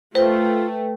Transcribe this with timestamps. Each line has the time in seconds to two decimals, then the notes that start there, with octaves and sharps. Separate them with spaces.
0.15 A3 F4 B4 C5 G5